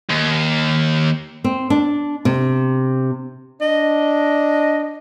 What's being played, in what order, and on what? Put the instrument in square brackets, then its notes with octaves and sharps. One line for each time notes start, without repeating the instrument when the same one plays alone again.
[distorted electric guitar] D#2
[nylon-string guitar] C4
D4
C3
[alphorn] D4 [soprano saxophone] D#5